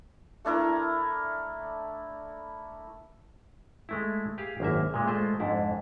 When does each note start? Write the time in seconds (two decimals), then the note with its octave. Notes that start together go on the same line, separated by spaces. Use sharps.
0.45 A3 D4 E4 A#4
3.89 G#3 A3 E4
4.38 G4 G#4 F5
4.60 G#1 F#2 A#3 E5
4.94 A#2 G#3
5.07 G#3 A3 F4 C5
5.40 F2 G#2 D4 E4